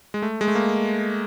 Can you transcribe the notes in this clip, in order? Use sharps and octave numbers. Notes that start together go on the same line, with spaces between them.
G#3
A3
G#3
A3
A#3